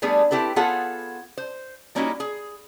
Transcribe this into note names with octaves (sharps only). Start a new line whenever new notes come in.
G3 A3 B3 D4 G#4
C4 E4 G4 A4 B4
B3 F4 G#4 A4 C#5 F#5
C5
G3 A#3 C#4 D#4 E4 F#4
G#4